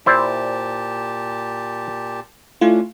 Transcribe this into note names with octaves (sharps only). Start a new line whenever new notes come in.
A#2 E4 G4 C5 D5 A5
A3 C#4 D4 E4 F4